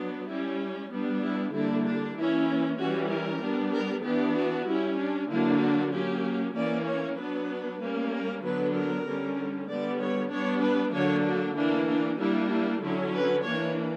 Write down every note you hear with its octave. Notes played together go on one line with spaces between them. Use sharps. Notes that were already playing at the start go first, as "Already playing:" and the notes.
Already playing: F#3 B3 D4
G3 C#4 E4
G3 B3 D4
E4
D3 G3 A#3 D4 E4
D4
E3 A#3 C#4 E4
E3 G3 C#4 F#4
A#4
G3 B3 D4
A#4
E3 B3 D4 G4
F#4
G3 C#4 E4
D4
D3 F#3 A#3 D4 E4
F#4
F#3 A#3 C#4 G4
E3 A#3 C#4 D5
C#5
F#3 B3 D4 B4
G3 A#3 C#4
A#4
D3 F#3 B3 D4 B4
A#4
D3 G3 C#4
D3 G3 B3 D5
C#5
G3 B3 D4 C#5
B4
D3 F#3 A#3 D4 C#5
F#4
E3 A#3 D4 E4
D4
G3 A#3 D4 E4
E4
D3 F#3 C#4 E4
B4
E3 A#3 D4 C#5